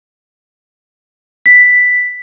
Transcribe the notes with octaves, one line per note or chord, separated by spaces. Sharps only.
B6